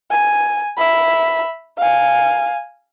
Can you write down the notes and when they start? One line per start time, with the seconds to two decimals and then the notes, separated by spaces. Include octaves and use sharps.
0.11 G#5
0.78 E5 B5
1.78 F5 G#5